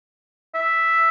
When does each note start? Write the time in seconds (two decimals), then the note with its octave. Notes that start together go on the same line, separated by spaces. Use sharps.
0.55 E5